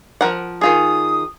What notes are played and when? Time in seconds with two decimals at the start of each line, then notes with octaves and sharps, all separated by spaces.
0.21 F3 A#4 F#5
0.61 D#3 F4 G#4 D#6